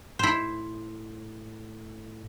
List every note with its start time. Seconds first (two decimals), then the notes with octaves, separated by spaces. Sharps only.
0.19 A2 E4 C5